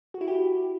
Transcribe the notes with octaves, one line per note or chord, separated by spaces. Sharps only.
F#4
E4
G4